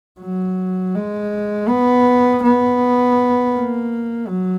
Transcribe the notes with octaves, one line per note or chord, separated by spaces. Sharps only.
F#3
G#3
B3
B3
A#3
F#3